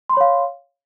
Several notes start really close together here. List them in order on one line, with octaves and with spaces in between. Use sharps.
C6 B5 C#5 F5